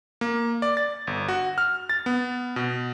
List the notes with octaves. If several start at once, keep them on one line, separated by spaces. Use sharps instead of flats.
A#3
D5
A6
G1
F#4
F6
A6
B3
B2